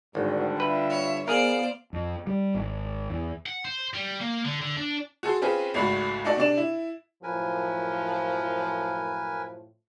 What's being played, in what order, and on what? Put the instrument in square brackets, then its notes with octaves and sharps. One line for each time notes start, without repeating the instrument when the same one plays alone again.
[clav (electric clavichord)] G#1 [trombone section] G2 D3 [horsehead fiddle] D#4 F#4
[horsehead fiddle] F4 E5 [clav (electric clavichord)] B4
[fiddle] C#5
[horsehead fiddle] B3 F5 [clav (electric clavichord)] G#4 A#4 [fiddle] C5 D5
[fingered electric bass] F2
G3
G#1
E2
[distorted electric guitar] F#5
C5
G3
A#3
D3
D3
D4
[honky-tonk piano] F#4 G#4 A4 C6
C4 C#4 F4 G#4 B4
G#1 C#2 A3 F#4 B5
A3 D#4 F#4 A4 D5
C3 D4 D5 E7
E4
[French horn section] F#2 A2 F3 [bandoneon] A#4 B4 G#5